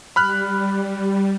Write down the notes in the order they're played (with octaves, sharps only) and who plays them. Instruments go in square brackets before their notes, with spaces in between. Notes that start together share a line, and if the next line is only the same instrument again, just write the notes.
[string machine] G3 [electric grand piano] B5 F6 F#6